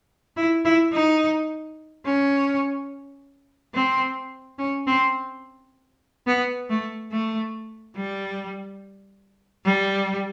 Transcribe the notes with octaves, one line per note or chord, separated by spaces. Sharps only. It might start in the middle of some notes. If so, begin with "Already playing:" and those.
E4
E4
D#4
C#4
C4
C#4
C4
B3
A3
A3
G3
G3